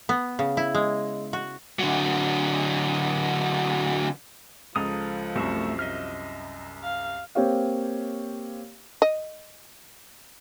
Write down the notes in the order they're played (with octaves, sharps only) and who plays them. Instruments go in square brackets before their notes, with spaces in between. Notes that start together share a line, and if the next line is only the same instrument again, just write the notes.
[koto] B3
C#3
E4
G#3
F#4
[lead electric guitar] D3 F#3
[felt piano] C#2 [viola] F3 [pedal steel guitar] A4 A#5 D#6
[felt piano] C2 F#2 [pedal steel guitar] A3 E5 C#6
[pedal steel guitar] D#5 E5 F6
[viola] F5
[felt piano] A#3 C4 G4 C#5 F5
[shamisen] D#5